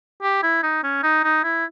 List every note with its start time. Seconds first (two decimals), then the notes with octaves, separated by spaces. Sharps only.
0.22 G4
0.43 E4
0.63 D#4
0.83 C#4
1.03 D#4
1.24 D#4
1.44 E4